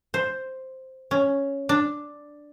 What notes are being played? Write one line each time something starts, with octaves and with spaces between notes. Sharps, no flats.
C5
C#4
D4